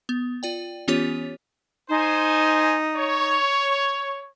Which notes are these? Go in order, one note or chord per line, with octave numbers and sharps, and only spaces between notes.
B3
F4 D5 G5
E3 B3 C#4 F4 G4 C#5
D#4 C5 G#5
C#5